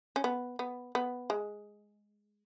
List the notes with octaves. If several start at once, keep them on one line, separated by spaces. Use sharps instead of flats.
C#4
B3
B3
B3
G#3